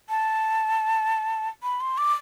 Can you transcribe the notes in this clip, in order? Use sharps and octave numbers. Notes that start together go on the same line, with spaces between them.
A5
B5
C6
D6